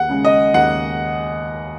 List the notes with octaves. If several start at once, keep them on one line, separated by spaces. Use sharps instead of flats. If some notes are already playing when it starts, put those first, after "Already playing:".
Already playing: D#2 F#5
C#3 G#3
D#5
D#2 F#5